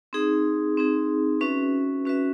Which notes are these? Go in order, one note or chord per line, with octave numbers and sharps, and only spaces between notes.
C4 D#4 G#4
C4 D#4 G#4
C#4 F#4 B4 E5
C#4 F#4 B4 E5